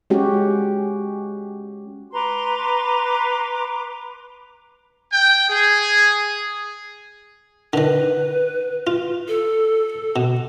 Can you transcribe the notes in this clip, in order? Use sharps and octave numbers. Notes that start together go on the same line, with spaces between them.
G#3 C#4 F#4 G4
B4 A#5 C6 D6
G5
G#4
D3 D#3 B4
F4
A4
B2